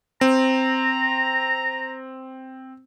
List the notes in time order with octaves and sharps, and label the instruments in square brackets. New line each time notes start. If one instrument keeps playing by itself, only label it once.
[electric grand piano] C4 [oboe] A#5